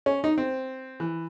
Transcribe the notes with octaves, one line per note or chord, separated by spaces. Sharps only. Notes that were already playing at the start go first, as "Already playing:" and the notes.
C#4
D#4
C4
E3